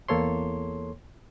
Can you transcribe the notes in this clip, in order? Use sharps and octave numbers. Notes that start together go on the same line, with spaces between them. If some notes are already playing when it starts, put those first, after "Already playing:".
E2 A#3 A4 C#5 C6